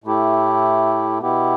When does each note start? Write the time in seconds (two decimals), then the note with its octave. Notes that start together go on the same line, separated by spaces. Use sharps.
0.04 A2 A3 E4 G4
1.20 B2 B3 E4 G4